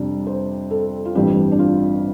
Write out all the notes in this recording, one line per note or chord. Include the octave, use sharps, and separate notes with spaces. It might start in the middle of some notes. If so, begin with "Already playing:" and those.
Already playing: F2 C3 G3 D4
C5
A4
F4
A1 G2 G3 C4 G4
D4
F4